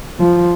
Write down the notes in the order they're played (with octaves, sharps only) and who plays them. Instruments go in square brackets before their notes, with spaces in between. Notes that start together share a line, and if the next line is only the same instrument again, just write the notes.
[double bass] F3